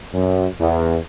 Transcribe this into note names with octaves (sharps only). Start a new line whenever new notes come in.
F#2
E2